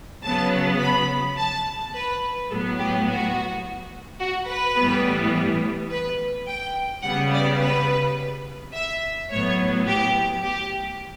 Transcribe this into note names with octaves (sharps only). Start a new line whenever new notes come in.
C#3 F#3 B3 A5
B5
A5
B4
A2 F#3 B3 A4
G4
F#4
F#4
B4
A2 E3 G3 B3
B4
G5
C#3 G3 B3 F#5
D5
B4
E5
A2 F#3 B3 C#5
G4
G4